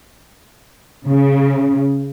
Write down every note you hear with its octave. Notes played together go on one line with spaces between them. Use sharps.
C#3